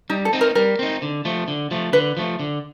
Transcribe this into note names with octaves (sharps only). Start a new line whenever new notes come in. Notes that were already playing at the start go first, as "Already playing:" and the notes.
G3 D#4
A4
C4 D#4
A#4
G3 A#4
C4 D#4
D3
F3 A3
D3
F3 A3
D3 B4
F3 A3
D3